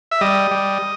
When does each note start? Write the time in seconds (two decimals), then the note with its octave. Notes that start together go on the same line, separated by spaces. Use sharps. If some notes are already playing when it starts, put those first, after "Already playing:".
0.11 E5
0.21 G3 D#5
0.51 G3